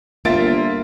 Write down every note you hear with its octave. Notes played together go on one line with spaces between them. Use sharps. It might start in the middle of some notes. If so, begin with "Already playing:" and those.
G1 A#3 F4 E5 A6 D7